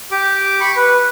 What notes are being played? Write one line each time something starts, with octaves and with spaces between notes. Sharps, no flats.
G4 D6
B5 C#6
B4